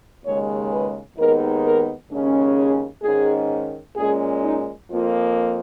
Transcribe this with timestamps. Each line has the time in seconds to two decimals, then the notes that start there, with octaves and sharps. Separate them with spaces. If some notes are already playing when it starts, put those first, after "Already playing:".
0.24 D#2 C#3 G#3 C#5
0.71 B4
1.17 D#2 D#3 G#3 B3 D#4 A#4
1.64 A#4
2.10 D#2 C#3 G#3 C#4
2.57 G#4
3.03 G#2 D#3 G#3 C#4 G#4
3.96 A#2 G#3 C#4 G#4
4.42 D#4
4.89 F2 F3 A#3 F4